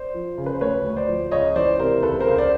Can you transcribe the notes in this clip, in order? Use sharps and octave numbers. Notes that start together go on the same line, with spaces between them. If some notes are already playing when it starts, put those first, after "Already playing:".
Already playing: C5 D5
F3
C#3
B4
C5
D2 B4 C#5
D2
C5 D5
F3
C#2 C#5 D#5
E3 C5 D5
C3 A#4 C5
C#2 A4 B4
A#4 C5
C#2
C5 D5